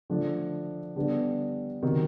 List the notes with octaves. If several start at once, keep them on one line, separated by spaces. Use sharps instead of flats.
D3 F3 A3 D4
D3 G3 B3 D4
C3 D#3 F#3